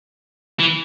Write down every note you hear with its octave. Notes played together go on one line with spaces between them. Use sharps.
E3